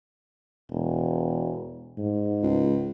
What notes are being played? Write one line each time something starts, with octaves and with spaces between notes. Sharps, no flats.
E1
G#2
C#2